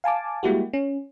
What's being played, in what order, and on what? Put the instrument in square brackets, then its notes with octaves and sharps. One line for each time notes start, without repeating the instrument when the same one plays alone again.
[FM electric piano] F5 G#5 A5 D6
G3 G#3 A#3 E4 F#4 G4
C#4